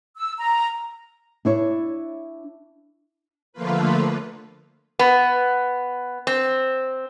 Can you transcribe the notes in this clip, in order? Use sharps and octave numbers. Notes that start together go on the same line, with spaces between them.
E6
A#5
D4 E4 C#5
D3 F3 A3 A#3 F4 B4
B3
C4